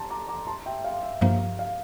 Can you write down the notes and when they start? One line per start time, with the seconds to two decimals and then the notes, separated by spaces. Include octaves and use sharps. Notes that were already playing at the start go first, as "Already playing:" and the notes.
Already playing: A5 A#5 C6
0.10 A#5 D6
0.28 A#5 D6
0.47 A5 C6
0.66 E5 G5
0.84 F5
1.03 E5
1.21 G2 F3 A#3 F5
1.59 F5